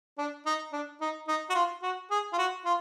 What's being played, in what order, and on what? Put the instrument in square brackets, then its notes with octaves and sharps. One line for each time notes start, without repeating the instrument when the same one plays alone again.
[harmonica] D4
D#4
D4
D#4
D#4
F#4
F4
F#4
G#4
F4
F#4
F4